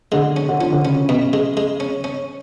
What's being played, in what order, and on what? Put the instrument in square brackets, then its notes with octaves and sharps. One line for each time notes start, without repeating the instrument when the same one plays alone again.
[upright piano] D3 [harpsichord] G#3
[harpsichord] C#4
[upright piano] D3
[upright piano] F3 [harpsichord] C#4
[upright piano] D3
[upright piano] C#3 [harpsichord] C#4
[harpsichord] B2
G#3
G#3
C#4
C#4